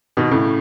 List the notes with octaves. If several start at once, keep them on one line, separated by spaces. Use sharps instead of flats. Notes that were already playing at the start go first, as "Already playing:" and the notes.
B2 D#3
A2 C#3